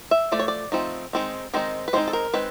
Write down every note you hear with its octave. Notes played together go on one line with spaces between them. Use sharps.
E5
F3 A3 D5
C#5
D5
F3 A3 C4 D#4
D#3 G#3 C4 D#4
D#3 G#3 C4 D#4
B4
D#3 G#3 C4 D#4 C5
A4
A#4
D#3 G#3 C4 B4